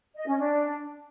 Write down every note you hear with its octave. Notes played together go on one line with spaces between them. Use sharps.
D#5
C#4
D4